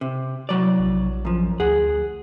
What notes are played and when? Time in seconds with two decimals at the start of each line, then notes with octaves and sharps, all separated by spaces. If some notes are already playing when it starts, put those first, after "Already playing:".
0.01 C3
0.49 C2 F#3 D5
0.79 A#1
1.25 F#2 F3
1.60 D2 G#4 F#5